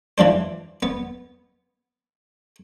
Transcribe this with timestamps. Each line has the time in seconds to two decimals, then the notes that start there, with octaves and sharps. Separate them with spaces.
0.18 E3 F3 D4 C5
0.83 B3